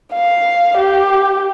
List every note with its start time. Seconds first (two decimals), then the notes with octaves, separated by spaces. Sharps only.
0.14 F5
0.77 G4